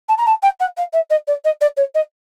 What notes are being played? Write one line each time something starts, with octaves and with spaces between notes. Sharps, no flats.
A5
A#5
A5
G5
F#5
F5
E5
D#5
D5
D#5
D5
C#5
D#5